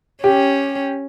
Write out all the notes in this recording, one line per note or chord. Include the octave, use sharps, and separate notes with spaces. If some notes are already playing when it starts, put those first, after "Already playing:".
C#4 G4